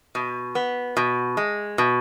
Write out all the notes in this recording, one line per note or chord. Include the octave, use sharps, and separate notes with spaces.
B2
B3
B2
G#3
B2